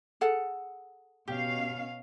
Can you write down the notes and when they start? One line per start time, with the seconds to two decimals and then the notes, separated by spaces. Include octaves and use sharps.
0.21 G#4 A4 F#5
1.28 B2 C#4 G4 F5